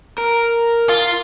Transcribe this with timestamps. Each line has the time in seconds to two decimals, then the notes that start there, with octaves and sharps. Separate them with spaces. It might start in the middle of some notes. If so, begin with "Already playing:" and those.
0.18 A#4
0.89 F4